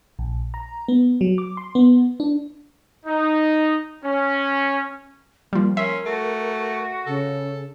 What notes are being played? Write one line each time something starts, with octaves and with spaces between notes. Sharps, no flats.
A#1
A#5
B3
F#3
D6
C6
B3
D4
D#4
C#4
F3 G3 A#3
C#4 A#4 E5 C6
A3 F#4
C#3 A4